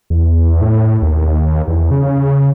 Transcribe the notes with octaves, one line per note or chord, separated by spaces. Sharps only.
E2
A2
D#2
E2
C#3